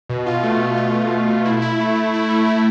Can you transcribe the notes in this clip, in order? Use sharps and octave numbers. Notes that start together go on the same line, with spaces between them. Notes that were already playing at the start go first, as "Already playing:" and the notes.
B2
F4
A3
A3
F4
A3
A3
A3
E4
E4
A3
A3
E4
A3
E4